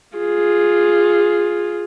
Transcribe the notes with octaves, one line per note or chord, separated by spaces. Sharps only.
F4 G#4